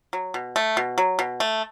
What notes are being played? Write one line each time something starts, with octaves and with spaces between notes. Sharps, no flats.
F#3
B2
A3
B2
F#3
B2
A3